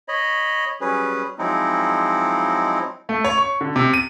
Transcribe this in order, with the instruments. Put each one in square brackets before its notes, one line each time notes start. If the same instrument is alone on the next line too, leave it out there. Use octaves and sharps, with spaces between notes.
[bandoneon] C#5 D#5 B5
F#3 G3 C#4 G#4 B4
F3 F#3 G#3 C4 D#4 E4
[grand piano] A3
C#5
C#6
D3
C3
D#7